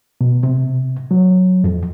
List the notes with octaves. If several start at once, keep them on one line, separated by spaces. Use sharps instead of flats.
B2
C3
F#3
F2